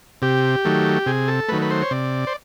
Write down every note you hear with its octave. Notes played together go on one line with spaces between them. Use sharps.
C3 G4
D#3 F#3 A3
C3 G#4
A4
D#3 F#3 A3 B4
B4
C5
C#5
C3 D5
C5